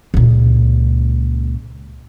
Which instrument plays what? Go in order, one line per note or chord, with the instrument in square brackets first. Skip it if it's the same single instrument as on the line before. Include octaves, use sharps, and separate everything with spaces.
[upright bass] C#2 A#2